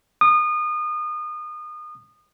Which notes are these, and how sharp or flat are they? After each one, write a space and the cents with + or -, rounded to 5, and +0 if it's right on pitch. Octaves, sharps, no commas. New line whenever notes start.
D#6 -30